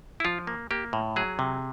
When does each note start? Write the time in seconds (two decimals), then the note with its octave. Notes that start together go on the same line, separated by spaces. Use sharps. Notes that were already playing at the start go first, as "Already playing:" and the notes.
0.20 E4
0.25 F3 F4
0.47 A#3
0.71 A#3 G4
0.93 A2
1.16 F#3 G#4
1.39 C3